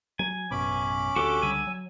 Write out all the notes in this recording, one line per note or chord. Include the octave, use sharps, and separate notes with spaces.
F#3 G#5
A1 F#2 B2 C#4 B5 D6
D2 F#4 G4 A4
C#2 D3 G3 G#5 E6
F#3